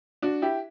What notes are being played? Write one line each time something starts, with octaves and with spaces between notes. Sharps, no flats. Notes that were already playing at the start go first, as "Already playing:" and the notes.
D4 F#4
E4 G4